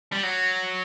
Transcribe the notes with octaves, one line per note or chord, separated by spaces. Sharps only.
G3
F#3